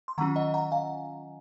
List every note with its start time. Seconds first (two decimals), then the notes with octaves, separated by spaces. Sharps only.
0.08 C6
0.18 D#3 F#3 C#4 F4 F#5 A#5
0.36 D#5 F#5
0.54 F#5 A#5
0.72 F5 G#5